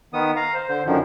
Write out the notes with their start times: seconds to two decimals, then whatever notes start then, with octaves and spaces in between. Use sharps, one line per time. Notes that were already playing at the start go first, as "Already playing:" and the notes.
0.13 D#3 B3 D#6
0.36 F5 A#5
0.54 C5
0.69 D3 C5
0.86 F#2 D3 D#3 F3